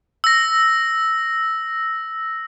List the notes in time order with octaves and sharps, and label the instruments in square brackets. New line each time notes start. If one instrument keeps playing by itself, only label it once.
[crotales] E6 A#6